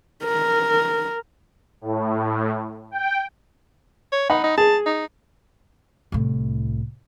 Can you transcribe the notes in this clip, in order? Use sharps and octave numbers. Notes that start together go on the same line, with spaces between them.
A#4
A2
G5
C#5
D#4 D#5 F#5 B5
D#4
G#4 A5
D#4
C2 A2